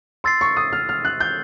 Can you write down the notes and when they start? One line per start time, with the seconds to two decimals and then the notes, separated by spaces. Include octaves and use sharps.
0.24 C6 E6 A6 C7
0.41 C#6
0.57 D#6
0.73 F6
0.89 F6
1.05 F#6
1.20 G6